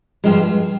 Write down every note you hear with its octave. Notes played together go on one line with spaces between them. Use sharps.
G2 F3 G#3